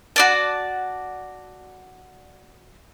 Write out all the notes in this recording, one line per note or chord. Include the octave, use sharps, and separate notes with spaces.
F#4 D5 A5